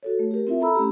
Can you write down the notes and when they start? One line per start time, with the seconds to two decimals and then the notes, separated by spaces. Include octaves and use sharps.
0.03 F#4 A4 C#5
0.19 A3
0.31 G4 A#4
0.47 C4 E4 F4 E5
0.60 E4 A4 A#5 B5 E6
0.75 A3 C#4 G4